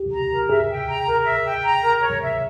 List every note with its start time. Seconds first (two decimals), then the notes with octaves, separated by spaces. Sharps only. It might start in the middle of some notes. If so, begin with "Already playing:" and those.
Already playing: G4
0.12 A#5
0.31 A#4
0.49 G#4 E5
0.69 G5
0.88 A#5
1.07 A#4
1.25 E5
1.45 G5
1.63 A#5
1.82 A#4
2.01 C#5
2.21 E5